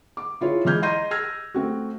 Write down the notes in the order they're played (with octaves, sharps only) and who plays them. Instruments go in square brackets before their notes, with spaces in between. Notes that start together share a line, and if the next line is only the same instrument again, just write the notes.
[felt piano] D6
E4 F4 G#4 C#5
E3 G#3 F6 G6 G#6
D#5 A#5 C6 G6 A#6 D#7
E6 F6 G#6 A#6
A3 C4 F#4